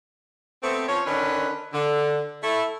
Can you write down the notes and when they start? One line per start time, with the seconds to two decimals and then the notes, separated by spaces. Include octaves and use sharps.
0.63 A3 B3 C4
0.87 F3 C#4 C#5
1.05 D3 D#3 C#4 D4 B4
1.73 D3
2.42 A3 E4